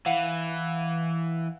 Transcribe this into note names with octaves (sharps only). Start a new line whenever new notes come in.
E3 F5 F#5